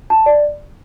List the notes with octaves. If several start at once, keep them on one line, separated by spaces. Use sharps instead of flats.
A5
D5